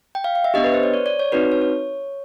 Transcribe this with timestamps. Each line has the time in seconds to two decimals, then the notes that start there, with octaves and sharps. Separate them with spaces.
0.15 G5
0.24 F5
0.35 F5
0.44 E5
0.54 B3 D4 G4 D#5
0.64 B4
0.74 C5
0.83 C#5
0.94 D5
1.06 D5
1.19 C#5
1.32 C4 D#4 F#4 B4
1.52 C#5
1.62 C#5